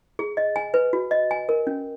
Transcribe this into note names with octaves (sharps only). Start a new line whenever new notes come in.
G#4
D#5
G#5
B4
F#4
D#5
G#5
A#4
C#4